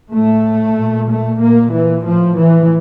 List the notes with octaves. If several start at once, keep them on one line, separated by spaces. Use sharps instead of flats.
A2 A3
A#2
A3
A#2 A#3
E3
A2 F3
E3